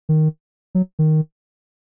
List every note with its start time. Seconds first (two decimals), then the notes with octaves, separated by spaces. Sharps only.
0.09 D#3
0.75 F#3
0.99 D#3